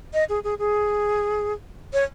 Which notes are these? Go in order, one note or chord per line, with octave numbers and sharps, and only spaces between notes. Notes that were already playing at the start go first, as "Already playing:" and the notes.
D#5
G#4
G#4
G#4
C#5